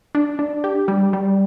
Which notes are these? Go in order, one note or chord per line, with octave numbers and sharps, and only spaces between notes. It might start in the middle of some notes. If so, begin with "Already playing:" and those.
D4
D4
G4
G3
G3